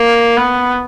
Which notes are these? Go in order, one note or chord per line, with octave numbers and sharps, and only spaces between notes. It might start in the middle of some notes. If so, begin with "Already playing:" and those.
Already playing: A#3
B3